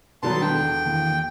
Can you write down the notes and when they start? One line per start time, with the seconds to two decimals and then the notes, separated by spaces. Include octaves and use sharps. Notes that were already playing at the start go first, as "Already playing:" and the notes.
0.23 B2 D#3 F#3 G3 B3 A4 A5 C6
0.42 E1 D3 G5
0.86 D#3 E3 A#3